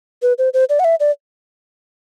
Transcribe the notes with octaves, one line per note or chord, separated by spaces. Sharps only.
B4
C5
C5
D5
F#5
E5
D5